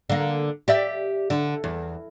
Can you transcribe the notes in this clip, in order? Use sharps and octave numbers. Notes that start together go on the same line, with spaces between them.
D3 A#3
G4 D5 E5
D3
E2